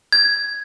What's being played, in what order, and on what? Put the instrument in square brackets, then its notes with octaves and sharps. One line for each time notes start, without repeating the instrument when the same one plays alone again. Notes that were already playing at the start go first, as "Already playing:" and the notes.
[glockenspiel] G#6